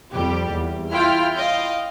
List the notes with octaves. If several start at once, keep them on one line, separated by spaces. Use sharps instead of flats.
F2 G3 G4
E2
E4 F4 G5 F6
D#5 F5 G5